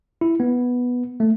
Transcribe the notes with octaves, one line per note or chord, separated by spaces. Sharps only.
E4
B3
A3